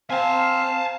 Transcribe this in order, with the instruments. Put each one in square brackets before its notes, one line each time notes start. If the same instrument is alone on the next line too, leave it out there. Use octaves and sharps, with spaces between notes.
[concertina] C4 [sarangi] F5 [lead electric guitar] G#5 A5